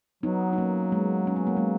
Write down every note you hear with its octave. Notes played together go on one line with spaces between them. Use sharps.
F#3 B3 D#4
D#4
A#3 C#4
G#3 B3
C#4
B3
A#3
G#3 B3